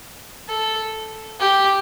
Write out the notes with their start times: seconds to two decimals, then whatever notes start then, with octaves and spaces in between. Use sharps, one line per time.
0.49 A4
1.40 G4